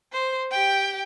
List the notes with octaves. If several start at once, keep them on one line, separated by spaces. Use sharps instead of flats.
C5
G4 G5